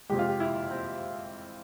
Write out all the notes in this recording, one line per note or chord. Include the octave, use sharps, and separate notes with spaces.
F2 C3 F3 G#3 G4
F4
G4
E4
C4